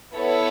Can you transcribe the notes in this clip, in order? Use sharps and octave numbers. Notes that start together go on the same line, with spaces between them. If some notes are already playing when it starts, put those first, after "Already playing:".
B3 E4 A4 C#5 E5